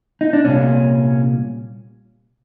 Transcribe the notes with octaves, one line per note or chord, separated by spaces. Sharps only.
D#4
D4
C2 A#2 C#4